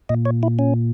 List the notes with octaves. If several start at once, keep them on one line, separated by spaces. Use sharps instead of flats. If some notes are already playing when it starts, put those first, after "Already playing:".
A#2 D#5
C#5
E4
C#4